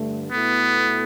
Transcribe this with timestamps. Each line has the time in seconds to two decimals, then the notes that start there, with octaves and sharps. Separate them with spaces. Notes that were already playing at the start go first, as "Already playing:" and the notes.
Already playing: G2 D3 A3
0.31 B2 A3 B3 E4 A4